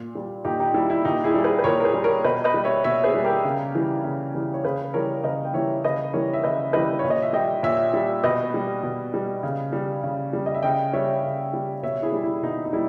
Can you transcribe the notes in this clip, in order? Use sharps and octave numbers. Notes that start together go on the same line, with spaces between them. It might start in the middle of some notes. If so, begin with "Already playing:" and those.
Already playing: A#2
G3
A#2 D#4 G4
D#4 G4
G3 E4
E4
A#2 D#4 G4
E4 G#4
G3
G#4 B4
B4
A#2 A#4 C#5
A#4
G#4 B4
G3
A#4 C#5
B2 B4 D#5
B4 D#5
G3
C#5 E5
B2 C#5 E5
G#4 B4
G3
G4 A#4
C#3
E3 G3
C#3
E3 G3
C#5
C#3 G#4 B4
E3 G3 A#4 C#5
C#3 B4 D#5
G5
E3 G3 C#5 E5
C#3 B4 D#5
E3 G3 A#4 C#5
E5
C#3 B4 D#5
E3 G3 B4 D#5
A#2 C#5
D#5
E5
G3 D#5 G5
A#2 C#5 E5
G3
B2 B4 D#5
G3
B2
G3
C#3
G3
C#3
G3
D#5
E5
C#3 D#5 G5
G3 C#5 E5
C#3
G3
B2 C#5 E5
E4 G#4
G3
E4
B2 D#4
D#4
G3 E4